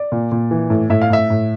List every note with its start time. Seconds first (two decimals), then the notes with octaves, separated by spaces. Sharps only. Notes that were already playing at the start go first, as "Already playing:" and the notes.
Already playing: D5
0.12 A#2
0.32 A#2
0.51 E3
0.70 A2
0.90 A2 E5
1.02 F5
1.10 A2 E5
1.30 A2